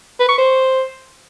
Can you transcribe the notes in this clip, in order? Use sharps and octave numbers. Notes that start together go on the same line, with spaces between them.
B4
C#6
C5